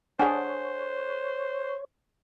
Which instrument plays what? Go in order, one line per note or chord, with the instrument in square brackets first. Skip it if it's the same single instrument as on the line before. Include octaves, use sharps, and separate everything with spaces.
[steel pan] D4 G#4 [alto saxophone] C5 [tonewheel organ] C#5 [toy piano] F#5 G#5